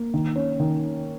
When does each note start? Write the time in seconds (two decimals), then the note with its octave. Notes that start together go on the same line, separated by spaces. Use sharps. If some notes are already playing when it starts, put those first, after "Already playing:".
Already playing: A#3
0.14 D#3
0.36 C#4
0.60 D#3